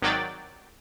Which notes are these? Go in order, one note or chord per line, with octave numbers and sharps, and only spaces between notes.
G#1 D#3 F#3 D5 G5 A6